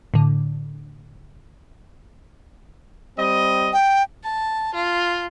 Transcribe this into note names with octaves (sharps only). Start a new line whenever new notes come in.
A2 D3
G3 C4 D#5
G5
A5
F4